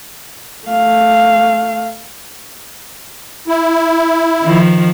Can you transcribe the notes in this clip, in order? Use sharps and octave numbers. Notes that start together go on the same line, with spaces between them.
A3 F5
E4
D#3 F3